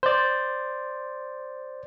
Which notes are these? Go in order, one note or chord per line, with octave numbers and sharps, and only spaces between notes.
C5 D5